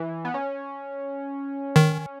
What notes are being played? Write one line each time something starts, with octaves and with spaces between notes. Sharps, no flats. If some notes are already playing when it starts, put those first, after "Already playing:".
Already playing: E3
B3
C#4
D#3